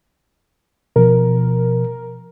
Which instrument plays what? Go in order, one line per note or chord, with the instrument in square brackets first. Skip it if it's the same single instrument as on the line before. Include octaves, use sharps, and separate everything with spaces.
[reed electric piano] B2 F3 [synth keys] A#4